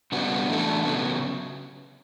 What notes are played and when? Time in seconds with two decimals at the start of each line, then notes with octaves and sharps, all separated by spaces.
0.12 C#3 G3 B3 D4 F#4
0.49 E3 A3 D4 A4
0.85 C#3 F#3 B3